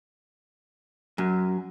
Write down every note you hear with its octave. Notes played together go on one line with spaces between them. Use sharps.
F#2